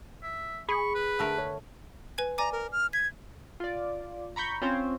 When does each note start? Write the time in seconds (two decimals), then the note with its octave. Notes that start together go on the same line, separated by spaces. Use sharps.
0.23 E5
0.69 G#4 B5 C#6
0.94 B4
1.19 D3 A3 A#4
1.38 C#5
2.18 B4 G#5 G#6
2.38 D5 G#5 A#5 D6
2.52 A#4
2.72 F6
2.93 G#6 B6
3.60 F4 D5
4.36 A#5 B5 C#6 G6
4.61 C4 C#4 F4 C5 C#5